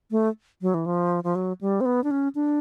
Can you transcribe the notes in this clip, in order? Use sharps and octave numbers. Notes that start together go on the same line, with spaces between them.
A3
F#3
E3
F3
F3
F#3
G3
C4
B3
D4
C#4
D4